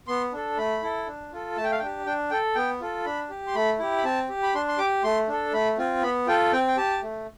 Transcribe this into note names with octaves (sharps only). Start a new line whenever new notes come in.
B3 C6
D4 A4
A3 B5
E4 A4
D4
F4 A4
A3 A5
G5
F5
G5
D4 G4
D4 G5
A4 G5
B3 G5
F4 A4
D4 B5
G4
C6
A3 B5
E4 G4
B5
C4 A5
G4
B5
D4 C6
C6
G4 D6
A3 C6
D4 A4
A3 B5
C4 F4
B3 B5
F4 A4 G5
C4 G5
G5
G4 A5
A3